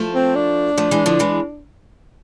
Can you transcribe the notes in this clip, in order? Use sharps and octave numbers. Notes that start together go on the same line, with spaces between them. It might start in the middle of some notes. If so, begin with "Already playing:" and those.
Already playing: F3 A3
C4
D4
F3 A3
E3 G#3
D3 F3
E3 G#3